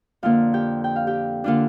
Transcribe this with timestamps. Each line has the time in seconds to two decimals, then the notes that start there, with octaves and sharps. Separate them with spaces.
0.23 F2 D3 A#3 F4 F5
0.54 G4 G5
0.84 G5
0.96 F5
1.07 G4 G5
1.44 D3 A#3 D4 F4 F5